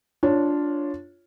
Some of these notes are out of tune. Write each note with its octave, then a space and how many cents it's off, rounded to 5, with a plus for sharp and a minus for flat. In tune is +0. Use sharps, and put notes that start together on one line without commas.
D4 -5 F4 +0 C#5 +0